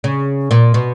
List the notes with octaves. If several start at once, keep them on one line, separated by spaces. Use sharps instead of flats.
C#3
A#2
B2